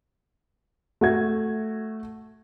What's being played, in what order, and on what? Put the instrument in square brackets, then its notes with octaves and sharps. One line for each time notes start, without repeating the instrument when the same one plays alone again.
[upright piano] A3 F#4 G#6